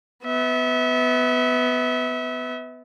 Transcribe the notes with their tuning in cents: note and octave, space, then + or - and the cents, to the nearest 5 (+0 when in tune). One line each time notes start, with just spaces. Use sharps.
B3 +15 E5 -30